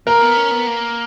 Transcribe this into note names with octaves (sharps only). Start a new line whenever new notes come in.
A#3 A#4
B3
C#4
B3
A#3